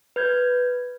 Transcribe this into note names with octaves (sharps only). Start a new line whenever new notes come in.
B4 G6 G#6